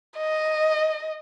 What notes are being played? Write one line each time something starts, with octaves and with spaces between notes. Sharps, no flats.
D#5